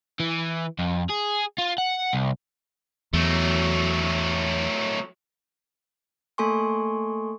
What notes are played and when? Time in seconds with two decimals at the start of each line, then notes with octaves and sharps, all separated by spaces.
0.20 E3
0.79 F2
1.10 G#4
1.58 F4
1.78 F#5
2.13 C2
3.13 E2 F#3 A3
6.38 A3 A#3 A4 G#5 C6 C#6